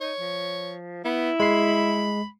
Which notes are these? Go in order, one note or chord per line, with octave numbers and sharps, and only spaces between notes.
D#4 C#5
F3
B3 E4
G#3 B5 C7